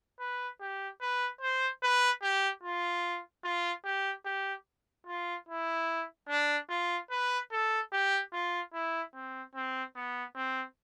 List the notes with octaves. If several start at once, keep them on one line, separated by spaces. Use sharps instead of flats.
B4
G4
B4
C5
B4
G4
F4
F4
G4
G4
F4
E4
D4
F4
B4
A4
G4
F4
E4
C4
C4
B3
C4